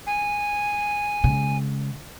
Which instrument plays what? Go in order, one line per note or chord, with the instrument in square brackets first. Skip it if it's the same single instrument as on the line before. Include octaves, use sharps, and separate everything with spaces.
[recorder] G#5
[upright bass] C#3 G#3